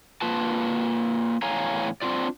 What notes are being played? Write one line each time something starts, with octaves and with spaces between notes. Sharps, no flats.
A#3 F4 B4 A5
E2 A2 C#5 F5 G#5 A#5
C4 D4 F4 D5